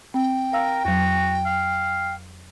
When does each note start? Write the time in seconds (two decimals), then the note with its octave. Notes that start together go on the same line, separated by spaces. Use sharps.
0.14 C4 G5
0.53 A#4 F5 E6
0.85 F2 F#3 F#4
1.46 F5